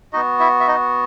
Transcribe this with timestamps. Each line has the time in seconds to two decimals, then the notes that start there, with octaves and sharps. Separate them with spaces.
0.13 B3 D#4 F#4 D#5
0.40 E4 E5
0.60 E5
0.67 D#4 D#5